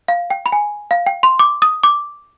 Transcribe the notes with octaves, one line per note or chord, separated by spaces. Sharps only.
F5
G5
B5
G#5
F5
G5
C6
D6
D#6
D6